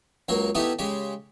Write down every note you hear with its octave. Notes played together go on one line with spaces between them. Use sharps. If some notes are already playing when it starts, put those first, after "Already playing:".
C#2 F#3 A#3 A#4
A3 B3 D#4 E4 G4
C#3 G#3 G4